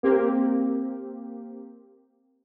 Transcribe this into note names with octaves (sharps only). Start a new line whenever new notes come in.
A#3 C4 G4